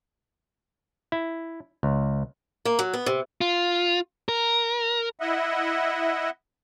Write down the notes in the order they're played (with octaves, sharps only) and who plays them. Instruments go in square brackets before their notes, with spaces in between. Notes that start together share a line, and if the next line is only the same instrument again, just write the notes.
[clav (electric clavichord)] E4
C#2
[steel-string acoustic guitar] A#3
F#3
B3
C3
[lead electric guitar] F4
A#4
[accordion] E4 D#5 E5 F#5